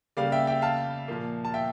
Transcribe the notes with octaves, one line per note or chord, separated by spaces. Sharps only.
C#3 G3 A#3 D5 F5
E5 G5
E5 G5
F5 A5
A#2 F3 A#3
A5
E5 G5